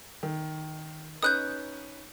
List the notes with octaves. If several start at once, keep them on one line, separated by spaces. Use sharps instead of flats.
D#3
C#4 D#4 B4 D#6 F#6 G6